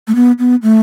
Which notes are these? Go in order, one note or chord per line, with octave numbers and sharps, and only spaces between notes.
A3
B3
B3
A3